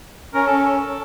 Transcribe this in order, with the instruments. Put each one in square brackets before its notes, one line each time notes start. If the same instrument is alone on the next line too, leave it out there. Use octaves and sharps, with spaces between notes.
[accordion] C#4 [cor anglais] A#4
[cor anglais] A4
A4